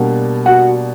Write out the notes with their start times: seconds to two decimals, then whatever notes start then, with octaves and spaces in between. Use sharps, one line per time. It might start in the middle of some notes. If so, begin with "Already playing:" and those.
Already playing: B2 G3 A#3 D4
0.46 F#4 F#5